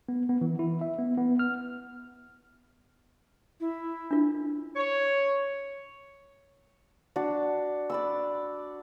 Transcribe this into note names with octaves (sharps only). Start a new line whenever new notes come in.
B3
B3
E3
E4
E5
B3
B3
F6
E4
D4 F4
C#5
D4 F#4
D5 B5 E6